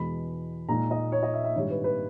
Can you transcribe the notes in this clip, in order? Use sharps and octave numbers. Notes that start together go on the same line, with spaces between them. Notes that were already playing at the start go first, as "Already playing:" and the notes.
Already playing: E2 B2 G#3 B3 B5
A#2 G#3 D#4 A#5
D#5
C#5
D#5
E5
E5
G#1 G2 G3 C#5
B4
B4